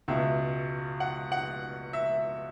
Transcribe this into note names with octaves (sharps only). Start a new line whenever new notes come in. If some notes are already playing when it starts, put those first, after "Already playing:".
C#2 B2 E5
F#5
F#5
E5